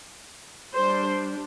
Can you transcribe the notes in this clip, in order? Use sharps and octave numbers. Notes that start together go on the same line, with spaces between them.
G3 D4 C5